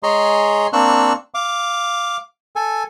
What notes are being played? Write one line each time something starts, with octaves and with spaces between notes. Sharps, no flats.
G#3 G#4 C#5 A#5 C6
A#3 C4 D4 C#6 E6 F#6
F5 D6
A4 G#5